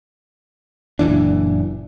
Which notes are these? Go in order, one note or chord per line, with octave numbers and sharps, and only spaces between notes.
F#1 A#2 E3 D4